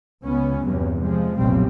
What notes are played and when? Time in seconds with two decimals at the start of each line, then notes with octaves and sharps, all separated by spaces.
0.25 C#2 B3 C#4
0.65 E2 G2 C3 F#3
1.00 C3 F3 G#3
1.38 F1 B1 F#2 A#2 G3 C4